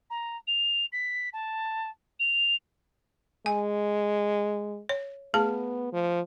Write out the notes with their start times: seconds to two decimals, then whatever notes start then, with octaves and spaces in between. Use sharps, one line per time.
0.10 A#5
0.47 F7
0.92 B6
1.33 A5
2.19 F7
3.46 G#3 G#5
4.89 C#5
5.34 A3 B3 G#4 A5
5.93 F3